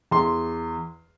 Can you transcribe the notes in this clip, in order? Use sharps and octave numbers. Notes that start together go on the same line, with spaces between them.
E2 C6